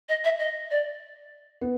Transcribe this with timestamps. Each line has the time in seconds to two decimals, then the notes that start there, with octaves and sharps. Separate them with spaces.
0.09 D#5
0.24 E5
0.39 D#5
0.71 D5
1.61 B3